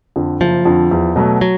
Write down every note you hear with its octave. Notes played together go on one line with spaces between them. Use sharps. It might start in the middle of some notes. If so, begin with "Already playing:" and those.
F2 D3
F#1 F3
F2 D3
E2
B2 F#3 A3
F#3